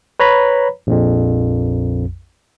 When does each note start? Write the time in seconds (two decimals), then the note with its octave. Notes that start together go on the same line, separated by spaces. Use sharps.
0.20 B4 C#5 A#5 B5
0.87 A#1 F2